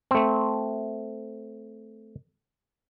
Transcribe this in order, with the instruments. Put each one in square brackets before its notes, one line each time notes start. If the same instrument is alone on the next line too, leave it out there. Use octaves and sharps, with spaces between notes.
[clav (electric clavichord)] A3 C4